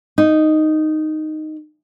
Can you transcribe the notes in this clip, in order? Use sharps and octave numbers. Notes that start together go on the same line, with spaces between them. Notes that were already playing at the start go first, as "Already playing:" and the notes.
D#4